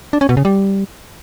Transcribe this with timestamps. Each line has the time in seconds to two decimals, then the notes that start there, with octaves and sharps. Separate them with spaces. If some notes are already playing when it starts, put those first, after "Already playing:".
0.13 D4
0.21 C#4
0.29 B2
0.37 C#3
0.45 G3